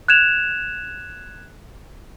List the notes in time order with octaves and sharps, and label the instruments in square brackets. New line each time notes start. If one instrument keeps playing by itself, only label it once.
[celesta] F#6 G#6 E7 F7